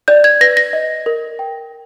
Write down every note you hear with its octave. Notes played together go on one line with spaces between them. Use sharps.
D5 G6
G#6
B4 A#6
A#6
D#5
A#4
G5